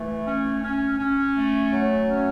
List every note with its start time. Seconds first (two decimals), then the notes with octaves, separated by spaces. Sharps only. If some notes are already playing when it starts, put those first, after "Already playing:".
Already playing: E3 A3
0.27 C#4
0.63 C#4
0.99 C#4
1.36 A3
1.73 F#3
2.10 C#4